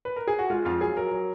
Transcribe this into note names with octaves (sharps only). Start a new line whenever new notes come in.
B4
A#4
G#4
F#4
G#3 F4
F2 F4
F#3 G#4
F#3 A#4
F#3